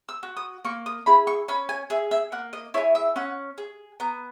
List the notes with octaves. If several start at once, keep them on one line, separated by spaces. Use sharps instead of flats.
E6
F#4
D#6
A#3 C#6
D#6
E4 G#4 B5
C#6
C#4 B5
G#5
G#4 E5
E5
A#3 F#5
D#5
E4 G#4 C#5
E5
C#4 F#5
G#4
B3 A#5